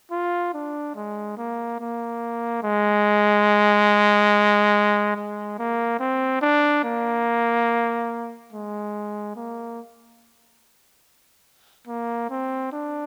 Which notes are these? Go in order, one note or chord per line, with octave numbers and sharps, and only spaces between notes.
F4
D4
G#3
A#3
A#3
G#3
G#3
A#3
C4
D4
A#3
G#3
A#3
A#3
C4
D4